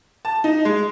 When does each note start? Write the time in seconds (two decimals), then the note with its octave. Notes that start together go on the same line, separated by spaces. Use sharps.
0.25 A5
0.44 D#4
0.65 G#3